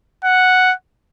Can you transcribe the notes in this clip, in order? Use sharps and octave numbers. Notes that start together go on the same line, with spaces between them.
F#5